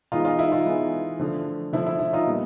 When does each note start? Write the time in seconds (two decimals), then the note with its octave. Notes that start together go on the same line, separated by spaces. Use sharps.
0.12 E3 G#3 B3 D#4 F4
0.25 D#4 F4
0.39 E4
0.52 D#4 F4
0.65 E3 G#3 B3
1.19 D3 F3 A3
1.73 D3 F3 A3 E4
1.86 E4
1.99 E4
2.13 D#4 F4
2.26 A#2 G3 B3